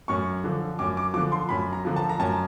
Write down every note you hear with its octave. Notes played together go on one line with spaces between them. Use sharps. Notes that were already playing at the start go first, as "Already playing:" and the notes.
F#2 C#6
D3 F3
F#2 D6
D6
D3 F3 D6
C6
F#2 B5
A#5
D3 F3
A5
A#5
F#2 A5